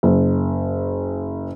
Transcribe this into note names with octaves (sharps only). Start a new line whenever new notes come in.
F#1